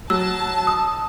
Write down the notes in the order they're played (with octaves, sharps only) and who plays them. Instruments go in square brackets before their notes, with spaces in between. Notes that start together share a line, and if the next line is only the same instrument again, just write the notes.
[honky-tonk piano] F#3 [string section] A5 [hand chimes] E6
[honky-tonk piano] D#6